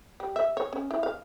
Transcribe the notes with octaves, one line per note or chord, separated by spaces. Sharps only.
G3
E5
C#5
C#4
E4
F5